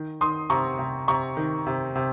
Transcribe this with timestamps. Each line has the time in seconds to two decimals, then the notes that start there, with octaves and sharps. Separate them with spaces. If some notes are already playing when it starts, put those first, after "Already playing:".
Already playing: D#3
0.21 D#3 C6 D#6
0.50 C3 A#5 C#6
0.79 C3
1.08 C3 A#5 C#6
1.37 D#3
1.67 C3
1.96 C3